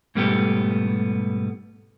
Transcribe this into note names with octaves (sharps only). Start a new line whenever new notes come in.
G#2 B2 G3 A3 B3 G4